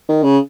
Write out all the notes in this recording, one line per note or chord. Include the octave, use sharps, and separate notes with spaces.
D#3
C#3